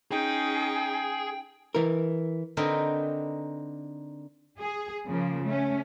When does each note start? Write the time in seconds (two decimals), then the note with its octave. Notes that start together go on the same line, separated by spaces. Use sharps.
0.11 C#4 D#4 G#4 G5
1.75 E3 A#4
2.57 D3 C4 D#4 A#4 B4
4.60 G#4
5.08 C#3 F3 A#3
5.45 A3 C#4